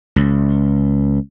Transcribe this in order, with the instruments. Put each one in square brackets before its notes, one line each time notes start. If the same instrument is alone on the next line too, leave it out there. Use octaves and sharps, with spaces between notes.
[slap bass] C#2